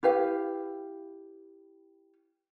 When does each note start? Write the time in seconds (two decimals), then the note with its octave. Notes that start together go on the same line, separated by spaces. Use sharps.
0.03 E4 G4 B4 F5